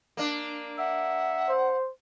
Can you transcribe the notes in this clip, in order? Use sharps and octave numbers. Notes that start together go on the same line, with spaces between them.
A#3 D4
E5 F#5
C5